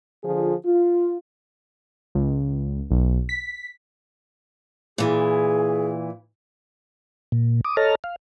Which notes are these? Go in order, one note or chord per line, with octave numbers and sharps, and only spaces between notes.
D3 F3 F4 G#4
F4
C#2
B1
B6
A#2 E3 G#4
A#2
D6 D#6
A4 C#5 D#5 A5 A#5 F6
F5